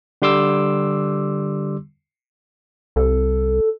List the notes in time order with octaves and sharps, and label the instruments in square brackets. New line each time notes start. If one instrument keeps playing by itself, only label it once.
[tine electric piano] D3 G3 C6 D6 E6
[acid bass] C2 [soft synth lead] A4